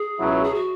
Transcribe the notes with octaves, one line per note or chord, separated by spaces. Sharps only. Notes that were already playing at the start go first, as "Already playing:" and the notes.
Already playing: G#4
C#2 B2 F#3 C#4 E4
G#4
F#4